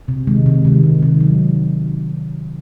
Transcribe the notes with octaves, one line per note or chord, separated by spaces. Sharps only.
C3
D#3 G#3
C3
D#3 G#3
C3
D#3 G#3
F#3